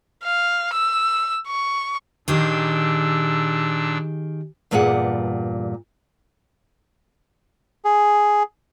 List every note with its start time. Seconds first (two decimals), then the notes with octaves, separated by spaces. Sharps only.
0.24 F5
0.73 E6
1.47 C#6
2.28 A#2 D#3 D4 G4 G#4 E6
4.71 E2 G2 A#2 G3 G#4 F#5
7.85 G#4